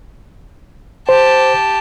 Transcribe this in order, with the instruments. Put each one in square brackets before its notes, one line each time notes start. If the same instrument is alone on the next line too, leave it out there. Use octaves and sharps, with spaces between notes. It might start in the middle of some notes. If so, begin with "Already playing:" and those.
[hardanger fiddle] G4 A5 [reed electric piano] C5